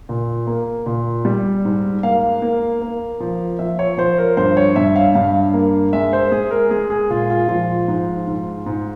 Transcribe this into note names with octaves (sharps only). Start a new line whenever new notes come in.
A#2
A#3
A#2
G3
G#2
A#3 F5
A#3
A#3
F3
F3 E5
C#5
F3 C5
A#4
G2 C5
C#5
G2 E5
F5
G2 F5
A#3
G#3 E5
C5
G#3 G#4
A#4
G#3 G#4
G#4
A#2 F4
F4
F3 F4
G#2
G#2
G#2